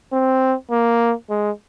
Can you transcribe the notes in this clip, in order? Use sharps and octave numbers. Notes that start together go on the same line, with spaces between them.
C4
A#3
G#3